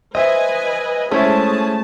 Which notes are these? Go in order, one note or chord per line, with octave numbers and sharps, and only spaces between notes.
B4 C5 D#5 E5 G#5
G#3 A3 C#4 E4 G#4 C5 A5